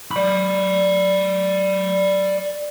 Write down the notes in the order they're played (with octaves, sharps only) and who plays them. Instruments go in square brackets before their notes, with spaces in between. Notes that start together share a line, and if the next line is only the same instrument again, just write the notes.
[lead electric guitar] D5 B5